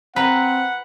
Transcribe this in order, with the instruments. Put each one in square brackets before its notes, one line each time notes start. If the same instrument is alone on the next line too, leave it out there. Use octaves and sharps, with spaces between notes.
[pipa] F3 A#4 A#5 [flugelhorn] C4 [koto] B4 [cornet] F#5